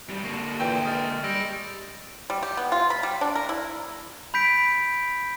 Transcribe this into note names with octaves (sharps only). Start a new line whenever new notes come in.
G#2 G3
D3 A#3 C#6
A#2 E3 G5 C#6 E6 G6
G#3 D#6 F6 A6
G3 E6 A#6 D7
G3
G4
B3
F4
B5
G3
D4
A#4
E4
B5 G6 B6 D7